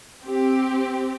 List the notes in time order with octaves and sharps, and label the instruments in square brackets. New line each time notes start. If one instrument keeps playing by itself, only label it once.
[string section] C4 G4